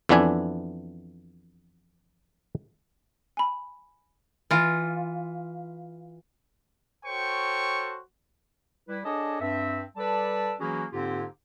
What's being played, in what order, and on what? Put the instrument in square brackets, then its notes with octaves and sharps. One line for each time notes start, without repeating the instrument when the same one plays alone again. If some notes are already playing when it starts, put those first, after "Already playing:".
[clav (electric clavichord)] F2 E3 B3 D4 E5 G#5
[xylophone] G#5 B5
[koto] E3 F4
[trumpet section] F#4 A4 C5 C#5 G5 C#6
[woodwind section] G3 E4 B4
D4 G#4 A4 C#5 D#5 A5
G2 C4 E5
G3 A4 B4 D5 A5
E3 F#3 A#3 C#4 F#4 G#4
G#2 D3 A#3 C4 F4 G4